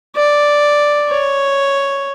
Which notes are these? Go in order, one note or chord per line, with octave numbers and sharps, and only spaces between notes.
D5
C#5